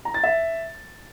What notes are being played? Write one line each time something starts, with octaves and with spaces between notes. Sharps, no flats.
A#5
A6
E5